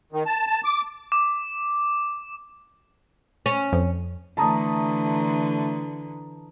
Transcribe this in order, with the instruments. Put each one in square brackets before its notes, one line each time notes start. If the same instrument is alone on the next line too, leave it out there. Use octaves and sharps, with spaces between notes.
[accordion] D#3
A5
A5
D6
[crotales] D6
[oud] C#4
[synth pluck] F2 F3
[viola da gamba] D3 E3 [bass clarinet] A3 [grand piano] A5 A#5 D#6